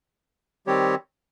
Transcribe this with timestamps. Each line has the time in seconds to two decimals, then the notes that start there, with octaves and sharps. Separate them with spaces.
0.67 D#3 G3 C4 G4 C#5